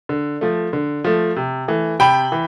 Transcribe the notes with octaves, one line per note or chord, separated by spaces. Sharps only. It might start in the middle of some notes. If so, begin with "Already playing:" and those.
D3
F3 A3
D3
F3 A3
C3
E3 A3
C3 G5 B5
E3